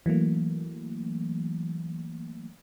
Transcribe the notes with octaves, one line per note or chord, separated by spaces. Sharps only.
E3 F#3 A3 A#3